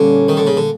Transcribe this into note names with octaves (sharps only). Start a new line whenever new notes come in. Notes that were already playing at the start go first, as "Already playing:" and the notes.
Already playing: A#2 D3 G3 A#3 C#4
D#3
D3
C#3
D3